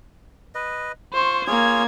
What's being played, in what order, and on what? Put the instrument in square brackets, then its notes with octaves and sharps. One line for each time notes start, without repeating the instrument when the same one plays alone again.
[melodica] B4 D#5
[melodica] F4 [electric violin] C5 C#6
[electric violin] A#3 G#6 [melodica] F4 G#4 C#5